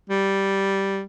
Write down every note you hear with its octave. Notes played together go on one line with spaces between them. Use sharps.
G3